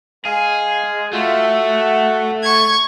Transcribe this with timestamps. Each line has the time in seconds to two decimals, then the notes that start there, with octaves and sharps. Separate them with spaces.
0.25 G#3 G#4 F5
1.13 A3 F4 F#4 E5
1.44 F#5
2.43 C#6 G#6